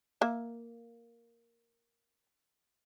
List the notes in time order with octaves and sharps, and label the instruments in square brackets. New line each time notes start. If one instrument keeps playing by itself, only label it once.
[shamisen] A#3 E5